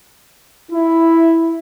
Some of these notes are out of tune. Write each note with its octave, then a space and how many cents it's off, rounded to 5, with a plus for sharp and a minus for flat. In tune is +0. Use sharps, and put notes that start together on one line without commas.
E4 +0